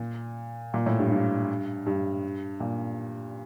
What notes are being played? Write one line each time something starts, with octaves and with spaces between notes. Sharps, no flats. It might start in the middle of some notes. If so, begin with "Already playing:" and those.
Already playing: A#2
A#2
A2
G2
G2
G2
A#2